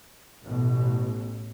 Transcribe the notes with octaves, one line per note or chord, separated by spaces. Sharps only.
A1 B2